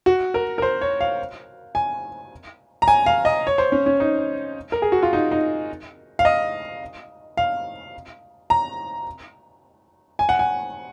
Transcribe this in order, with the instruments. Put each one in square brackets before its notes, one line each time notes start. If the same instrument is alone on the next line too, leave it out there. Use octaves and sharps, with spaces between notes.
[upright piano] F#4
A#4
A#4
C5
C#5
F5
G#5
A#5
G#5
F5
D#5
C#5
C5
C#4
C#4
D#4
A#4
G#4
F#4
F4
D#4
D#4
F5
D#5
F5
A#5
G#5
F#5
G#5